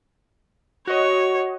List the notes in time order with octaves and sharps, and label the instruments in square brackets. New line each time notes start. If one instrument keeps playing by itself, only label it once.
[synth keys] F#4 D#5 [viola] C#5